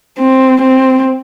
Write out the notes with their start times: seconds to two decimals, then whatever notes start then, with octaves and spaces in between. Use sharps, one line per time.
0.18 C4
0.62 C4